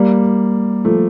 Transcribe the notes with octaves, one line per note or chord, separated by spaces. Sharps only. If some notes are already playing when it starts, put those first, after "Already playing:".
Already playing: G3 A#3
F3 A3